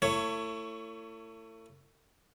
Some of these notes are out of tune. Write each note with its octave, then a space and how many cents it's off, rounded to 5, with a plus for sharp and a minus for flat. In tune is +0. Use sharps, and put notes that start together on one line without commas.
A3 +40 E4 +25 C#5 +5